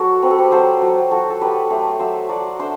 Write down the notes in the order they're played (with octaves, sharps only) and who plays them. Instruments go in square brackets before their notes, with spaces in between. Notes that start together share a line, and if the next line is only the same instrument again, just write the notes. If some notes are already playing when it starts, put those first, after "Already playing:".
Already playing: [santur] F#3 F#4 A4
C4 B4
A4
G4 B4
F#3 A4 C5
F#3
F#3 F#4 A4
A4
F#3 G4 B4
A3 A4 C5
F#3 C5 E5
F#3 D5 F#5
D4 C5 E5